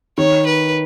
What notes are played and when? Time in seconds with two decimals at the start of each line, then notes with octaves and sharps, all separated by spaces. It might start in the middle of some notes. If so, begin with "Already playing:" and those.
0.18 D#3 C#5
0.46 B4